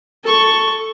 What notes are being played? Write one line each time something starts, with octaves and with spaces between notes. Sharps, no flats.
A4 C#6